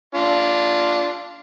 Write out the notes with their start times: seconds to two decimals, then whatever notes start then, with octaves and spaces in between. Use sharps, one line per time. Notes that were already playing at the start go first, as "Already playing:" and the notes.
0.15 D4 F4